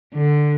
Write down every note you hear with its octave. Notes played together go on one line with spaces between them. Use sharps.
D3